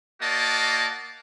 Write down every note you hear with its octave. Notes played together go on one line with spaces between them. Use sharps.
A#3 F#4 D5 D#5 A5